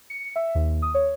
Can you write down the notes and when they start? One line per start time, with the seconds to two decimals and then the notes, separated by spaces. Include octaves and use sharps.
0.10 C#7
0.36 E5
0.55 D#2
0.82 D#6
0.94 C#5